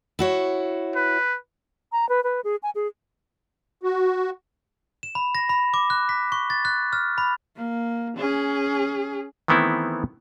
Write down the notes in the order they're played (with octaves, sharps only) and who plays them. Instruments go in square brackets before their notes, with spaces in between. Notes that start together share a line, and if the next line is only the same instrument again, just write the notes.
[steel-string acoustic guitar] E4 F#4 C#5
[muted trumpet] B4
[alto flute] A#5
B4
B4
G#4
G#5
G#4
[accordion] F#4
[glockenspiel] E7
B5
A#6
B5
D6
F#6
B6
C#6
A6
F#6
F6
B5
[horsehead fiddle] A#3
C#4 G#4
[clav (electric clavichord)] D#3 E3 A3 B3 C4 E4